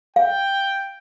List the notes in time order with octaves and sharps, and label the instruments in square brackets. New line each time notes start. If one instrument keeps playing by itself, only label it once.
[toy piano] F5 [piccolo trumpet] G5